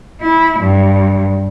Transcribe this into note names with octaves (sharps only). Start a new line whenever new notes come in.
E4
G2